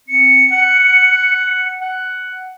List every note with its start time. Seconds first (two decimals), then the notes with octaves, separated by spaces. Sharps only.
0.08 C4 C#7
0.49 F#5
1.81 F#5